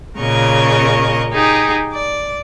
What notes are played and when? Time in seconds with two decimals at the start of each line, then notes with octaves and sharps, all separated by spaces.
0.19 A#2 C#3 A#4 D#5 C#6
1.32 D#4 G4 G#4
1.93 D5